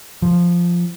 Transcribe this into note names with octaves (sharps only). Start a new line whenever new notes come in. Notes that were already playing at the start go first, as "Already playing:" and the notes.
F3